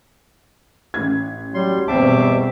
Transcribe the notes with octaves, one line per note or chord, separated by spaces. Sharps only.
A1 G#6
F#3 G3 C6
E2 G2 B2 C4 E5 A5 D6